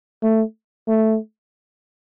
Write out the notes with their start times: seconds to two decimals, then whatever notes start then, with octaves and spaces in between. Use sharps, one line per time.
0.23 A3
0.88 A3